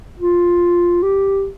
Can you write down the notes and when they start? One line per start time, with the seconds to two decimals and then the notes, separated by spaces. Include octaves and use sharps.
0.19 F4
1.03 G4